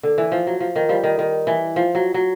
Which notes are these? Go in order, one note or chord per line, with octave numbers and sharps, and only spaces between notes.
D3
E3
F3
F#3
F3
D#3
F3 G3
D#3
D#3
E3
F3
F#3
F#3